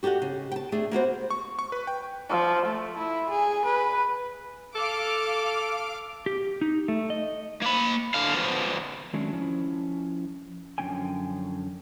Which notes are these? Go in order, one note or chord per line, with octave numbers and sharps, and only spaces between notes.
F#4 G4 A4 D#5 F#5
C#3
G5 A5
A3 D4 G#4
A#3 B3 F#4 C5
C#6
C#6
B4
G5
F3
A3
E4
G#4
B4
A4 F5 D6
G4
D#4
A3
D#5
A#3 B5
D3 F5
F3 B3
D#3 F#3 G#3 A3 C#4 D4
F3 C#4 E4
F#2 D3 F3 C#4 G5 G#5